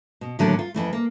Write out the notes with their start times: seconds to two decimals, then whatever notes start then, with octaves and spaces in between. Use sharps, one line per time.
0.21 B2
0.39 D#2 A2 D3 F#3 D4 A4
0.59 F4
0.74 F2 E3 A3
0.93 A#3